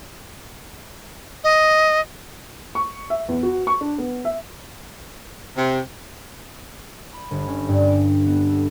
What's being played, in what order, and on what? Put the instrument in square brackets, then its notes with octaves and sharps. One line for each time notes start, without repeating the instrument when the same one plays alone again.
[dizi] D#5
[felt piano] C#6
E5
E2
F#4
C#6
D4
B3
E5
[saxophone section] C3
[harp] B5
G1
C#4
G2
D7
B3
A4